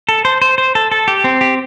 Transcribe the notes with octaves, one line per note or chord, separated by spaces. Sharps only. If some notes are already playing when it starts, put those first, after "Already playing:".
A4
C5
C5
C5
A4
A4
G4
C4
G4